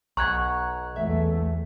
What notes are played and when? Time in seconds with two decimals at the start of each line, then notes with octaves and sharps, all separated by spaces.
0.17 B1 F#5 G#5 A#5 C#6 F#6 G#6
0.96 E2 A3 E5